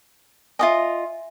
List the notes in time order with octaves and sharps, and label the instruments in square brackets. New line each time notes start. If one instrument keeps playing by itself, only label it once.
[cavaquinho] F4 F#4 D#5 [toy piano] E5 G#5